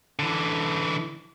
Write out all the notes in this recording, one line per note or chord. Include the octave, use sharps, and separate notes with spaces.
D3 E3